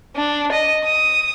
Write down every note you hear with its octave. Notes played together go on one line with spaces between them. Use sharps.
D4
D#5
D#6